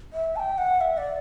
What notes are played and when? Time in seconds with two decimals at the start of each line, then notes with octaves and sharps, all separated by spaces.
0.13 E5
0.36 A5
0.39 G5
0.58 F#5
0.81 E5
0.97 D5